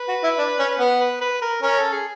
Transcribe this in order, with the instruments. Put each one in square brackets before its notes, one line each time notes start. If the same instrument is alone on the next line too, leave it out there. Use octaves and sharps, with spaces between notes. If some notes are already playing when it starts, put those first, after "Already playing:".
Already playing: [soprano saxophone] B4
[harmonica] F#4
E4
D4
C#4
B3
[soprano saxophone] B4
B4
A#4
[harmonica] C#4 [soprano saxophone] A#4
[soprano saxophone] A4
G#4